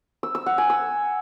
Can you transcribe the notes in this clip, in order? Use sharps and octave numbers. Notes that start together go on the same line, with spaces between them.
E6
E6
F#5
G#5
E6